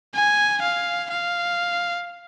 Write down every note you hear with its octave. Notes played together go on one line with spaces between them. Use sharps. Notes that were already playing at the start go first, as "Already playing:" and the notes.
G#5
F5
F5